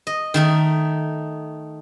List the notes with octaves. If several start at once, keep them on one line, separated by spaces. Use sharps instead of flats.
D#5
D#3 A3 D#4